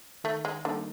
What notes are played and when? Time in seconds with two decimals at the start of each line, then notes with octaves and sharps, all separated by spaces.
0.24 D#3 A3
0.45 G#3
0.65 D3 G3 A#3 D#4